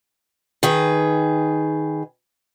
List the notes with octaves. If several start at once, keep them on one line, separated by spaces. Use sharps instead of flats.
D#3 G#4 B4